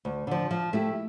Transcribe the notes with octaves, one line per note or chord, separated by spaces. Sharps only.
D2
D3 F3
F3
A3 E4 G4